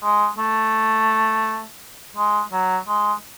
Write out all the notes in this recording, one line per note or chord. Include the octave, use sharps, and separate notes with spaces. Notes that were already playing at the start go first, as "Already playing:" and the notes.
G#3
A3
G#3
F#3
G#3